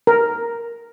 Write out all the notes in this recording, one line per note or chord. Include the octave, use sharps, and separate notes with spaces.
A#4